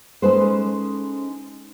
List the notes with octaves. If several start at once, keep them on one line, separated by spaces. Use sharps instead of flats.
G#3 C#4 D#4 A4 B4 C5